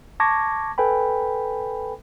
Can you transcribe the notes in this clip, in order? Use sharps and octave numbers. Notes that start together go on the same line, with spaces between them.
A5 C#6 D6 G#6 A#6
A4 B4 G5 G#5 B5